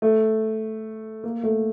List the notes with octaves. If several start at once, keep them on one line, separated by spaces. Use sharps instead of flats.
A3
A#3
A3